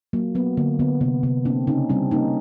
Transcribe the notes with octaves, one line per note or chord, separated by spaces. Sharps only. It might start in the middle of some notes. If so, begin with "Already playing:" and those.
F#3 A#3
F#3 B3
D3 A#3
D3 B3
C3 B3
C3 B3
A#3 C4 D4
C#3 C#4 D#4
G3 C4 D4
A#3 C#4 D#4